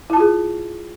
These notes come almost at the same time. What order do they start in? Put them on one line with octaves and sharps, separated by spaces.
E4 A5 F4 G#4